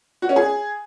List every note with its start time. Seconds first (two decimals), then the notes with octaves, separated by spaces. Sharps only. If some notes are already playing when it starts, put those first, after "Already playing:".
0.22 F#4
0.29 C#4
0.36 G#4